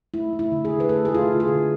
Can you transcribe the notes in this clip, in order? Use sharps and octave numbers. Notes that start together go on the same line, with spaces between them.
A3 E4
A3
E4
D3
G#4
D3
B4
A3 A4
A3 G#4
F4
D3
G#4
D3